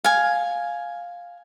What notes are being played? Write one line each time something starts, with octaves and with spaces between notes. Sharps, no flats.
F5 G#5